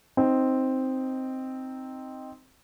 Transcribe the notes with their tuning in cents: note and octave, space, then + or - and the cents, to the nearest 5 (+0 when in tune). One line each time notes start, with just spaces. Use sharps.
C4 +0 D#4 +0